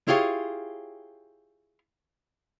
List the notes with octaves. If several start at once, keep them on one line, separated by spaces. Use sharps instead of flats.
E4 F4 G4 G#4 C#5